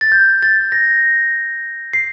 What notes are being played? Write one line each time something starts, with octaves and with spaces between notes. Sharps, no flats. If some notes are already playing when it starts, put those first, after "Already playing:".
A6
G6
A6
A#6
C7